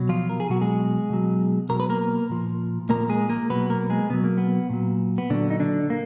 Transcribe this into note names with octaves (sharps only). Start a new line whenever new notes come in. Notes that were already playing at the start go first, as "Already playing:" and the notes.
Already playing: B2 F#3
F3 F4
A#4
G#4
B2 F#3 F#4
G#3 G#4
B2 F#3
B2 F#3 A#4
B4
A#3 A#4
A#2 F3
A#2 F3 A#3 A#4
G#3 G#4
A#3 A#4
B2 F#3 B3 B4
A#3 A#4
G#3 G#4
B2 F#3 B3
A#3
B3
A#2 F#3
B3
A#2 D3 F#3 D4
D#4
D3 D4
A#3